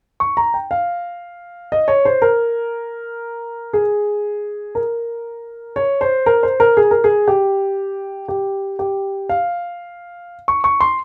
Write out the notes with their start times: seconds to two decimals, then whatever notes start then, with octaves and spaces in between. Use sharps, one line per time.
0.20 C#6
0.37 A#5
0.54 G5
0.71 F5
1.72 D#5
1.88 C#5
2.05 C5
2.22 A#4
3.73 G#4
4.75 A#4
5.76 C#5
6.01 C5
6.26 A#4
6.43 C5
6.60 A#4
6.77 G#4
6.91 A#4
7.04 G#4
7.28 G4
8.28 G4
8.79 G4
9.29 F5
10.48 C#6
10.64 C#6
10.81 C6